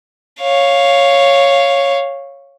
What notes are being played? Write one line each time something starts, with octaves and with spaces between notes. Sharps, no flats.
C#5 F5